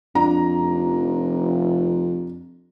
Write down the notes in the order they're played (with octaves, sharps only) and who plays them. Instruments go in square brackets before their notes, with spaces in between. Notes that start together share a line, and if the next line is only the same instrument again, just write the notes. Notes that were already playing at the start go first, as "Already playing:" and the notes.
[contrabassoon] F2 [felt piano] D4 A#5
[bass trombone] F1